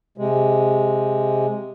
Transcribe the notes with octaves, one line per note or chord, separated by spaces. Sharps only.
C3 G#3